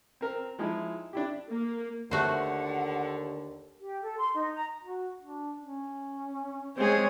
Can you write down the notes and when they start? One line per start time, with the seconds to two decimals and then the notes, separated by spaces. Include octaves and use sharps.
0.21 C4 A#4
0.59 F3 G#3 D#4 E4
1.13 D4 E4 G4
1.49 A#3
2.11 D#2 D3 A3 F#4 C5 F#5
3.81 G4
4.02 A4
4.18 C6
4.34 D#4
4.55 A#5
4.83 F#4
5.22 D4
5.61 C#4
6.77 G#3 C4 G#4 C#5